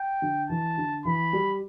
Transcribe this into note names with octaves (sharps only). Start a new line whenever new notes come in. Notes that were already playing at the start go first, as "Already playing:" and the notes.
Already playing: G5
D3
E3 A5
D3
E3 B5
G3